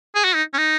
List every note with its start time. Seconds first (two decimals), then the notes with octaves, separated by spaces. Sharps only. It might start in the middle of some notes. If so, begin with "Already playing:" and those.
0.15 G#4
0.24 F#4
0.35 D#4
0.54 C#4
0.58 D#4